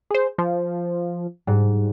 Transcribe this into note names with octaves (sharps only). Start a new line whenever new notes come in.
G#4 C5
F3
G#2 G3